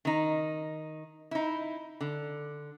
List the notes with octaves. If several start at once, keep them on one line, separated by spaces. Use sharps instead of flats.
D#3 D#4
D#4 E4
D3